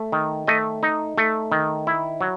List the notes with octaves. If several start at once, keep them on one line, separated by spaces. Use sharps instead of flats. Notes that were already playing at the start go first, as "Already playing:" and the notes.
Already playing: A3
D#3
A3 D#5
D#4
A3
D#3
E4
F#3